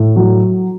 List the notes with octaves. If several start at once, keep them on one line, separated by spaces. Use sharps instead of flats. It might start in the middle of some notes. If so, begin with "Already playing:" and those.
Already playing: A2
F#3